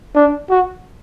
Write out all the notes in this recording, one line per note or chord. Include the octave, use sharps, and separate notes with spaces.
D4
F#4